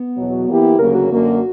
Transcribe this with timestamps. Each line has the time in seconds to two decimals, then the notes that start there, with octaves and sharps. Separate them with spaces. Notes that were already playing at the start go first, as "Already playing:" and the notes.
Already playing: B3
0.17 E2 B2 F#3
0.48 E3 A#3 E4 G4
0.79 D2 C#3 F#3 A#3 A#4
0.95 F#4
1.10 F#2 D3 A#3